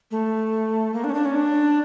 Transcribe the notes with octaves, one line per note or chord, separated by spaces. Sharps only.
A3
A#3
D4
C#4
D4
C#4
D4